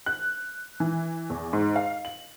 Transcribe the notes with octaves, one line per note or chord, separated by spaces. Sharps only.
F#6
E3
E2
G#2
F5
F#7